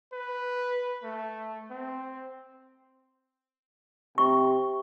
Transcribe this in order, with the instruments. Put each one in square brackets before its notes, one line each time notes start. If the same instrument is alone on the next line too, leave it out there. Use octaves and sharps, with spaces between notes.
[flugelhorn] B4
A3
C4
[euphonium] C3 [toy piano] C#6